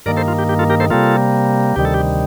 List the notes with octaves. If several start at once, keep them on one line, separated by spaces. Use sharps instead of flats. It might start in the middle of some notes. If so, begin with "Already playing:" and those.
G2 D#3 A#3 A#4 D5
A4 C5
F4
G4
G4
F4 A4
G4 A#4
A4 C5
C3 G3 A#3 F4 A4
D2 C3 D#3 G3 G4
A4
G4